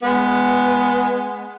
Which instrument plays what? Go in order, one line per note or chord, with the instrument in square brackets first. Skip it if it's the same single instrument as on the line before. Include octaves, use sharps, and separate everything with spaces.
[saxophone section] G#3 B3